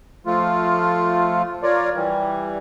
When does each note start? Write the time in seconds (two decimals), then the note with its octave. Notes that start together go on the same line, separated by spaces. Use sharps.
0.26 F3 A3 F4
1.63 F4 A#4 C#5 D5
1.95 E3 G3